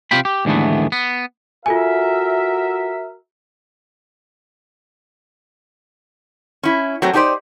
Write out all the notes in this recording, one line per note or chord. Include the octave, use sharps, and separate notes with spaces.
C3 F4 G5 B5
G4
D#2 G#2 D3 E3 A3 B3
B3
F4 F#4 A4 A#4 E5 G#5
C#4 E4
F#3 A3 C4
D4 D#4 G4 G#4 C5 D5